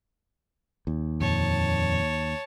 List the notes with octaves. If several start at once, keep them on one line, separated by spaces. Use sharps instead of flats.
D#2
F2 A#2 C#5 A5